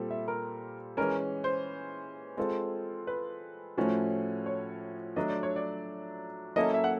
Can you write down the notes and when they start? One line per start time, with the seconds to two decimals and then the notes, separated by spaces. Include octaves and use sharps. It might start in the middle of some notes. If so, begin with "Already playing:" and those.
Already playing: A#2 G3 C4 A4
0.10 E5
0.28 A#4
0.97 E3 G#3 C#4 A#4
1.44 C5
2.37 G#3 C4 F4 A4
3.07 B4
3.77 A2 F3 A3 C#4 F#4
4.46 C#5
5.16 F#3 A3 D4 D#5
5.30 D5
5.43 C#5
5.56 D5
6.56 F#3 A#3 C#4 E4 A4 D#5
6.74 E5
6.84 F#5